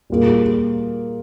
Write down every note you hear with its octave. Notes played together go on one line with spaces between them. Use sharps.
A#2 G3 A#3 F4 G#4